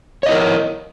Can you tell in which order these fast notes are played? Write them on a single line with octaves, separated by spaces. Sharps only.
C#5 D#5 E4 A#4